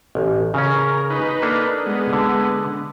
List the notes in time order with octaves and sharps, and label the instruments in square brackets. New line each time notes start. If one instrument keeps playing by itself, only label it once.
[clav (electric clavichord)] A1
[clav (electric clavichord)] C#3 C#4 [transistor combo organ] A#4
[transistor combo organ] D#4 B4
[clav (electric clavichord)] A#3 D4 A4
[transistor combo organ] G#3 B3
[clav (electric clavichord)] D3